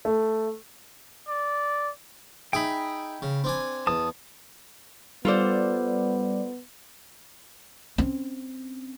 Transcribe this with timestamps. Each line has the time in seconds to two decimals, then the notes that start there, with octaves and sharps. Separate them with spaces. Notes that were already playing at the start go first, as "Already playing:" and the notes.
0.05 A3
1.28 D5
2.53 D#4 G#4 E5 G5 B5
3.22 C#3
3.44 C4 D4 G#5
3.87 E2 A5 D#6
5.25 G3 B3 F4 A4 C5 D5
7.98 C4 C#4